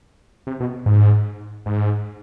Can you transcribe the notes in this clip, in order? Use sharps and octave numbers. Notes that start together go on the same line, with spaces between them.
C3
B2
G#2
G#2